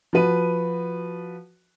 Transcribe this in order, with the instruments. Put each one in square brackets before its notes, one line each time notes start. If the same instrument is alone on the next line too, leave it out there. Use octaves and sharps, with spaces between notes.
[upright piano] F3 F#4 B4 D#7